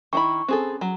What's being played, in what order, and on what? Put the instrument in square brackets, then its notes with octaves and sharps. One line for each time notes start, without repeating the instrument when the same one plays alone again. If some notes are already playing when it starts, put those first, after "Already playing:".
[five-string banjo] D#3 E4 B5 [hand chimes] C#6
[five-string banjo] C4 G#4 A4 [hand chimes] C#4
[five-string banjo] F#3